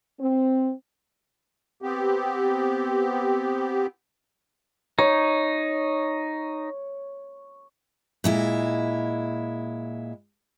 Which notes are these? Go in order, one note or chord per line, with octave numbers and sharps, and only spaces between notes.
C4
B3 C4 G4
D#4 C#5
A#2 G#3 E4